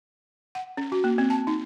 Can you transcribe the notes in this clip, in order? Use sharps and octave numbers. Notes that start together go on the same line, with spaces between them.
F#5
C#4
F#4
A#3
C4
A5
D#4